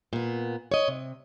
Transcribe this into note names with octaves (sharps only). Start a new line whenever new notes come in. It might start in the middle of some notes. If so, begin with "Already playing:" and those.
A#2 B3
C#5 D#5
C3